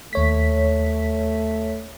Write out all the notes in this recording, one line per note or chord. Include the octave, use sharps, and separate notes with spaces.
D#2 A3 C#5 B6